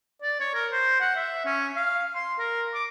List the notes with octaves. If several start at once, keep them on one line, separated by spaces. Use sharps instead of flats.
D5
C#5
A#4
C5
F#5
E5
C#4
F5
C6
A#4
D6